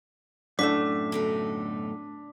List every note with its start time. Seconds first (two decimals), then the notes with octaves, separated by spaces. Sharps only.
0.59 F#2 A2 A3 D4 D6 B6
1.12 B2 D3 D#4